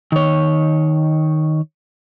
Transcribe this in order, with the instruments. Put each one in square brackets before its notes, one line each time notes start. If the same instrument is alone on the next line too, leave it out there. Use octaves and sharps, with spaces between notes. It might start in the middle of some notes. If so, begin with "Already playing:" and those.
[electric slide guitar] D#3 C#5